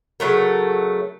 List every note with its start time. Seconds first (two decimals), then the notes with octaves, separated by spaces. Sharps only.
0.20 C#3 F#3 A3 A#4